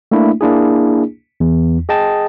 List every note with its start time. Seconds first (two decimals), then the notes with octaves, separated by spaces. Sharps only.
0.12 A3 A#3 D4 E4
0.41 A#3 D4 E4 G#4
1.40 E2
1.89 G#4 D#5 G5 A5